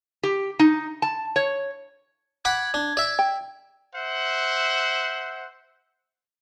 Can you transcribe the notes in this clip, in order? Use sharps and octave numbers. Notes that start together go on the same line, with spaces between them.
G4
D#4
A5
C#5
F#5 B5 D6 G#6
D4
D5 E5
G5
C5 E5 F#5